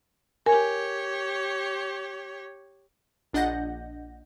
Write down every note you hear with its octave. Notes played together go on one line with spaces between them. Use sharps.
G4 A#4 C#5 G#5
A#1 D4 D#5 F#5 G6 A#6